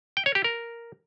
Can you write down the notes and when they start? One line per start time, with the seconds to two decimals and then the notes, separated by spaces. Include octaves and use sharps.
0.17 G5
0.26 C#5
0.35 G4
0.44 A#4